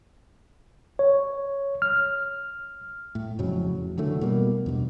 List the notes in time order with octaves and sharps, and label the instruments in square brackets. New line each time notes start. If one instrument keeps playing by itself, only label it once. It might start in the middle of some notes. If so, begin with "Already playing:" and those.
[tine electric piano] C#5
F6
[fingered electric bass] A2
F2 A2 C#3 F#3
F1
D3 E3 F#3 A3
B2 G3 A#3
E2 G2 B2